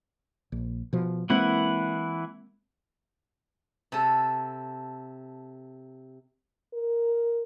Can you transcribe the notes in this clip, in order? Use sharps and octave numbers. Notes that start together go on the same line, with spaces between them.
A#1
B2 F3
E3 G#3 A#3 C4 E4 F#5
C3 A4
A#4